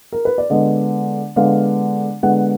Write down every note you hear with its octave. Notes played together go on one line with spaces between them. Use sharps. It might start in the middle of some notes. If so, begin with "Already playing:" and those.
A#4
B4
D5
D3 G#3 B3 D#5
D3 G#3 B3 F5
D3 G#3 B3 F#5